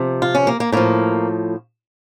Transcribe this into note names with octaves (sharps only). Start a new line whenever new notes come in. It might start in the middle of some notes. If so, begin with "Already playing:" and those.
Already playing: C3 F3
F4
C#4
A#3
A#3
A2 F3 A#3